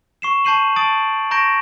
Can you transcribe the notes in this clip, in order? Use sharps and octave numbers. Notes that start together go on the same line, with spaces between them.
C#6 C7 E7
A5 C#6 G6 C7 D#7 F#7
A5 D#6 A6 D7 F#7
A#5 C#6 G6 A#6 D7